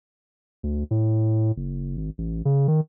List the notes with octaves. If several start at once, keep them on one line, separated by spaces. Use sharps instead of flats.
D2
A2
F#1
G#1
A1
C#3
D#3